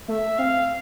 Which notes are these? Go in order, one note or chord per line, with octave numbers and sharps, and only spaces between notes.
A3 E5
C4 F5